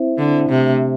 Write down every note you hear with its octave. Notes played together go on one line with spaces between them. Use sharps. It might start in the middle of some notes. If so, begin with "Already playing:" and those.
Already playing: C4 E4 C5 E5
D3
C3 A3 D4 C5 E5